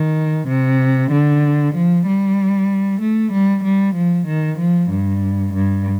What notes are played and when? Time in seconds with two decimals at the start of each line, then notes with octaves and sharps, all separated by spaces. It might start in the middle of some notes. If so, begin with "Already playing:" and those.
Already playing: D#3
0.48 C3
1.12 D3
1.75 F3
2.06 G3
3.01 A3
3.33 G3
3.64 G3
3.95 F3
4.27 D#3
4.59 F3
4.90 G2
5.54 G2